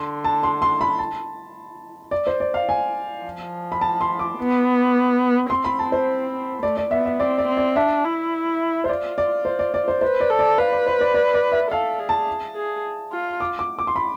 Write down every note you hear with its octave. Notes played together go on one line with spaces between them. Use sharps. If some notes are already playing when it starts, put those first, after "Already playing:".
Already playing: D3 C6
A5
C6
C6
B5
A5
D5
C5
D5
F5
G#5
F3
B5
A5
C6
D6
B3
C4 C6
B5
A5
C5
A3 D5
D5
B3 E5
E5
C4 D5
D5
C4
D5
D4 E5
E4
C5
F4 D5
D5
C5
D5
D5
C5
B4 C5
D5
A4
D5
B4 F5
D5
C5
D5
D5
D5
E5
A4 F5
G#4
A5
G#4
F4
D6
D6
D6
C6
B5